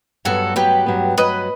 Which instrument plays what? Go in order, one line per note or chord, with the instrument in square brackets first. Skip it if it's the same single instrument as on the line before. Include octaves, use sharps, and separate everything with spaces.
[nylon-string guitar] G2 F#3 B3 [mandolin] F#4 A4
[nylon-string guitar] G2 F#3 B3 [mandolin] G4 B4
[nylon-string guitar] G2 F#3 B3
[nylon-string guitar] G2 F#3 B3 [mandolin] B4 D#5